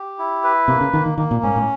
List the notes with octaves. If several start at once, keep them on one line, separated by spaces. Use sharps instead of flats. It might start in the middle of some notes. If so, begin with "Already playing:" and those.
Already playing: G4
E4
B4
C3 A#3
C#3
D#3 A#3
D#3
D#3 A#3
A#2
G#2 C#4
A2